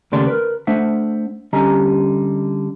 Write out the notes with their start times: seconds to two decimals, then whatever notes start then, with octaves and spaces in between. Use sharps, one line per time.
0.12 D#2 C#3 A3 G4 D5 C6
0.27 A#4 B4
0.67 A3 D4 C5 E5 F#5
1.53 D3 G3 C#4 G4 D#5 A#5